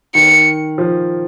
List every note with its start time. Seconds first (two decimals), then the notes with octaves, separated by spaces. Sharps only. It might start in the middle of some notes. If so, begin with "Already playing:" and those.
0.15 D#3 C#7
0.78 F3